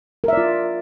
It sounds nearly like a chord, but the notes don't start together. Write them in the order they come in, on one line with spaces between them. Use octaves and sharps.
A#4 E5 D5 F4